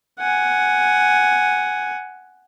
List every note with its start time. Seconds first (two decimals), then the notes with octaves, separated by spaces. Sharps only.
0.20 F#5 G#5